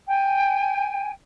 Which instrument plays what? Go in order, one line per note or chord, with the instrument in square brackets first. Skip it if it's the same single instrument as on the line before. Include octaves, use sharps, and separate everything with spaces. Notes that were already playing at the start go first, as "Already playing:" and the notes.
[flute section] G5 G#5